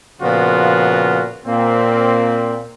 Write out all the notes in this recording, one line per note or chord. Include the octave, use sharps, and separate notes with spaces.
A#2 C#3 F3 B3 F4 F#4
A#2 A#3 C4